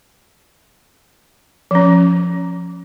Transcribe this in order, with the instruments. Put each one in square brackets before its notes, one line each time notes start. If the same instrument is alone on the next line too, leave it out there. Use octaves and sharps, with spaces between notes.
[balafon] F3 C#4